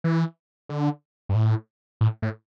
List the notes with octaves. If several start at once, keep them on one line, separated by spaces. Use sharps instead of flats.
E3
D3
G2
A2
A2
A2